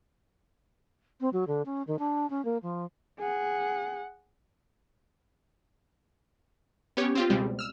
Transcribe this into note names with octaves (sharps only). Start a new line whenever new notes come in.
C4
F#3
D3
C#4
D#3
D4
C#4
A#3
F3
G#4 F#5
B3 C#4 G4 C#5
C4 F4 G4
C#2 B2 G3 G#3 C4
E6 F6